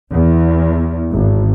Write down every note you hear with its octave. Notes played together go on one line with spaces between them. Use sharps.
E2
G#1